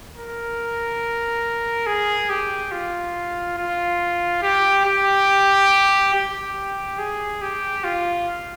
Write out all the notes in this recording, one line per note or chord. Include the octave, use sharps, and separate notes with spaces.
A#4
G#4
G4
F4
F4
G4
G4
G4
G#4
G4
F4